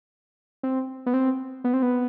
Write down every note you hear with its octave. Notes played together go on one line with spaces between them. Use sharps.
C4
B3
C4
B3
C4
B3